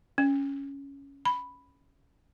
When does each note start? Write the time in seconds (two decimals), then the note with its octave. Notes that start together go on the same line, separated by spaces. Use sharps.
0.18 C#4
1.25 B5